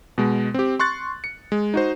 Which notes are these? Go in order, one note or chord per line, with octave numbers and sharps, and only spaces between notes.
B2 G#3
C4 G4
C6 C#6 F#6 A6
C#7
G#3
D#4 F#4 C5